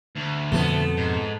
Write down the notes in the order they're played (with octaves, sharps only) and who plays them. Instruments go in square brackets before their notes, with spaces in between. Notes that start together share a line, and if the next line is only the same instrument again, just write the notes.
[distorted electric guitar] D2
[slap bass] F2 B2 F3 [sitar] A3 B3
[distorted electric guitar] G#2